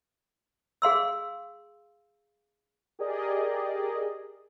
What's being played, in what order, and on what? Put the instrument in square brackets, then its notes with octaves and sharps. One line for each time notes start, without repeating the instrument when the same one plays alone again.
[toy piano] G#4 F5 C6 E6
[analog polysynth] G4 G#4 A#4 D5 D#5